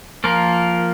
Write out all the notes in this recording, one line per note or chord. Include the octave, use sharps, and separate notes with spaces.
F3 A#3 F4 A#4